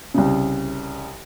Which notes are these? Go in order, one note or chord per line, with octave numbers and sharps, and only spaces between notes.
C2 C#3